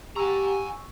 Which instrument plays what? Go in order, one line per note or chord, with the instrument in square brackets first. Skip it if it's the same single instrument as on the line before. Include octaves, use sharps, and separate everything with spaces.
[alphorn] G4 [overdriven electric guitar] G#5 A#5 [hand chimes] C#6 E6